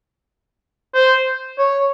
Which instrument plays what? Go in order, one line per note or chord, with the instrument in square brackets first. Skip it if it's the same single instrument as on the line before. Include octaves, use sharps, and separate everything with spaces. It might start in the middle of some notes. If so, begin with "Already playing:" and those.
[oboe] C5
C#5